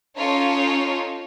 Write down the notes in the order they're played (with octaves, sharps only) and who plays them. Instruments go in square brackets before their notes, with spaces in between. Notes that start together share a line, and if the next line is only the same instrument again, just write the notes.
[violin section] C#4 D#4 F4 A4 C#5